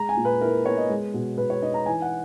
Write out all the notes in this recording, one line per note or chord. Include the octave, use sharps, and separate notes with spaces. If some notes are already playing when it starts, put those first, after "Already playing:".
Already playing: G#3 A#5
G#5
A#2
B4
E4 A#4
B3 C#5
D#5
G#3
B2
B2 B4
C#5
D#4 D#5
A#5
E3 G#5
F#5